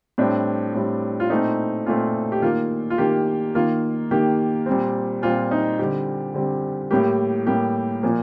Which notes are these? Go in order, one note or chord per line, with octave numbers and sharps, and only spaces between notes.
A2 G3 C4 D4
A2 G3 C4
F4
A#2 A3 C4 D#4
A#2 A3 C4 F4
G4
D#3 A#3 F4
F4
D#3 A#3 G4
D#3 A#3 F4
D#3 A#3 G4
A#2 G3 C4
A#2 G3 C4 F4
D#4
D3 G3 C4 G4
D3 G3 C4
A2 G3 A#3 G4
A2 G3 A#3 G4
A#2 F3 A#3